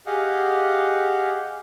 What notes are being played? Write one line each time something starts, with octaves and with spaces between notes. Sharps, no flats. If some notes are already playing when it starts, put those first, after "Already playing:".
G4 G#4 D#5 F5 F#5